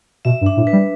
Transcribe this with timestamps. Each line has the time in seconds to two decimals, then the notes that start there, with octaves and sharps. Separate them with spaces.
0.25 B2 E5
0.41 G2
0.46 D4
0.57 A2
0.67 B4
0.73 G3